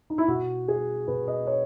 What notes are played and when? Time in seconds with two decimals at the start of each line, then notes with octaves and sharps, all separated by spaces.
0.10 D#4
0.18 E4
0.28 B2 F#4
0.68 G#4
1.07 B2 B4
1.28 D#5
1.47 C#5